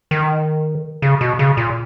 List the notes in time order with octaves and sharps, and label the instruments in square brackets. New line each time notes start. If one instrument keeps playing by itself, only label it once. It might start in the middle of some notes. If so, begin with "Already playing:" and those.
[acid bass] D#3
C#3
B2
C#3
A#2